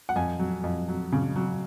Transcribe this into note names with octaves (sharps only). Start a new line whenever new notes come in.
F#5
F2 G#5
F#3
F2
F#3
C#3
F#3